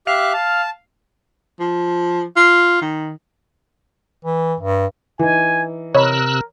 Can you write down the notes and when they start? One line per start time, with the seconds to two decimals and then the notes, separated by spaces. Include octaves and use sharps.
0.07 G4 E5 F5 F#6
0.34 A5
1.60 F3
2.36 F4
2.82 D#3
4.25 E3
4.60 G2
5.19 E3 D#4 G#5
5.95 C3 A#4 C#5 D#5 B5 E6 F#6